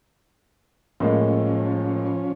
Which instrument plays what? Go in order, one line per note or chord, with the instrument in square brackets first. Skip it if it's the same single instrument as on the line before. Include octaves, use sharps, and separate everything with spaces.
[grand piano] A2 G#3 A#3 [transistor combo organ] F3 C#4